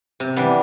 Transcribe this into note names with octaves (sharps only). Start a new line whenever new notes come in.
C3
E3 G3 B3 D4